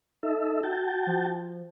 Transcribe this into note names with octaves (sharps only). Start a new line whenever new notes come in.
D#4 A4 E5
F#4 G5 A5
F3